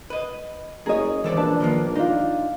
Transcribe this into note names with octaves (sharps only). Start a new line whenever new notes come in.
B4 D#5
F#1 G#4 A#4 C#5 D#5
G#1 E3 A4 D5
A#1 D4 B4 A5
D#3 F3 A#3
D4 D#4 F4